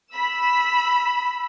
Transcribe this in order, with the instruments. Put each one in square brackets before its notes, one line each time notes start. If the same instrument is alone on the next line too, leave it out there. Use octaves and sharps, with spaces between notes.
[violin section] B5 E6